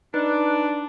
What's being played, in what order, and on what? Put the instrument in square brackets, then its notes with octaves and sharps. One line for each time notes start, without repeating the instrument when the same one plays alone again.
[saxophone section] D4 [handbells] D#4 B4 F#6